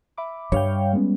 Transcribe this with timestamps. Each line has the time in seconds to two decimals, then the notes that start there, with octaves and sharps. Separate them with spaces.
0.17 E5 B5 D6
0.52 G2 G3 C#5 F5 G5
0.93 G#3 B3 C#4